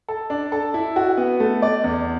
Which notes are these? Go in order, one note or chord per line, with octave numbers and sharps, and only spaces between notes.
A4
D4
A4
E4
F#4
B3
A3
D5
E2